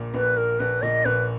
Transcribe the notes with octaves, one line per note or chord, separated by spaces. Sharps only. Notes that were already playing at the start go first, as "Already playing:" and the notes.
Already playing: A#1 A#2
A#1 B4
A#3 A#4
A#1 B4
A#2 D#5
A#1 B4